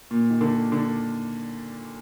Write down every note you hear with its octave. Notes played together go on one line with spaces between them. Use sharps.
A#2
D#3
D3
D3